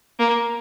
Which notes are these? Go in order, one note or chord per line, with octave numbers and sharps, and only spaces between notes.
A#3